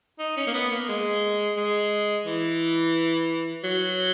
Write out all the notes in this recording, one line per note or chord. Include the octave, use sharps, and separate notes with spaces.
D#4
C#4
A#3
B3
A#3
G#3
G#3
E3
F#3